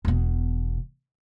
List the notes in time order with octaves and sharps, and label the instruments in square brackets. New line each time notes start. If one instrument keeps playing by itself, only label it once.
[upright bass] E1 B2